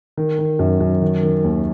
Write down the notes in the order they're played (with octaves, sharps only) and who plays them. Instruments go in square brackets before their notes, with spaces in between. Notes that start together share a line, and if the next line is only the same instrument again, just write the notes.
[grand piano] D#3
D#3
F#2
F#2
D#3
D#3
D#2